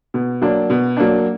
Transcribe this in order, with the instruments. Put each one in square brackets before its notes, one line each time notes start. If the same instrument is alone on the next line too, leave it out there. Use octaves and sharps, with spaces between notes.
[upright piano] B2
F#3 A#3 D4
B2
F#3 A#3 D4